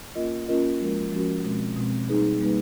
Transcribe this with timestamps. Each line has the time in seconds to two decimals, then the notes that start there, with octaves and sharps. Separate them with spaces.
0.15 A#3 C#4 F4 A#4 D#5
0.48 A#3 C#4 F4 A#4 D#5
0.80 F3 G#3 C#4 F#4 A#4
1.12 F3 G#3 C#4 F#4 A#4
1.45 B2 G#3 C4
1.76 B2 G#3 C4
2.09 G3 A#3 D#4 G#4 B4
2.41 G3 A#3 D#4 G#4 B4